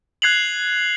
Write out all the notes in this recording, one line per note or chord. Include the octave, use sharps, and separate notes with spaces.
F#6 G#6 C7 F7 F#7